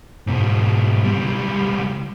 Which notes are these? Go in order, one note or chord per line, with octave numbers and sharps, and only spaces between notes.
G#2 B2
C#2 G3